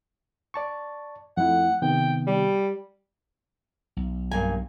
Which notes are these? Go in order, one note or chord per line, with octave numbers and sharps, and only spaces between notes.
D5 A5 C#6
F2 A3 E4 F#5
C3 D#3 B3 G5
G3
B1
G2 A#3 G#5